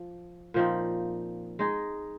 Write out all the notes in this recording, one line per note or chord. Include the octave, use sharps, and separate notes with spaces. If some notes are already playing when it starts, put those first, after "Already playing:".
Already playing: F3
A#2 F3 C4 D#4
G#3 D#4 G#4